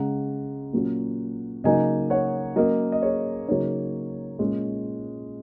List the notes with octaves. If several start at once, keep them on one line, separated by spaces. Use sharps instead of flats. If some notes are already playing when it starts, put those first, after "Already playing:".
Already playing: C#3 G#3 C#4 F#5 A#5
A#2 F#3 C#4
C#3 F#3 A#3 D#4 D#5 G#5
C#5 F#5
F#3 A#3 C#4 A#4 D#5
D#5
G#4 C#5
C#3 F#3 A#3 D#4 G#4 C#5
A#2 G#3 C#4